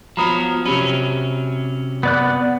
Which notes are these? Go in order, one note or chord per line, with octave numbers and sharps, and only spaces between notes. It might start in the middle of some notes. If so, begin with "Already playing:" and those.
F3 F#3 B3 A#5 B5 D#6
C3 F#3 C#4 G4 B5 D#7
B3 D5 F#6